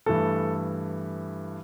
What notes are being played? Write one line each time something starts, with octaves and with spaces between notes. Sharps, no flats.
G2 E3 A3 A4